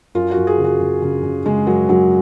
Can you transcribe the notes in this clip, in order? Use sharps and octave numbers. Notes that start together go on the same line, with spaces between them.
F#2 F4
F#4
F#2
G#4
C#3
F#4
C#3
C#3
C#3
C#3 G#3
F#2 F#3
F#2 F#3